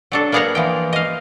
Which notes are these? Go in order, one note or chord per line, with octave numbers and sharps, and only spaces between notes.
F#3 D4 A4
A#3 B3 G#4 F5 F#5 A#5
E3 F3 G5
D#5 F5